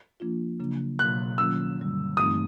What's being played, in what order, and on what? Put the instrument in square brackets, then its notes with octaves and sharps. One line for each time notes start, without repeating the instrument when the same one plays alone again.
[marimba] F3 A#3 D4 F4
C#3 F#3 A#3 D4
[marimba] B2 F#3 A#3 [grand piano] F#6
[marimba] D#3 F#3 A#3 C#4 F4 [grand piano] E6
[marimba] G2 D3 G3
[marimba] G2 E3 A3 C4 D#4 [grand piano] D#6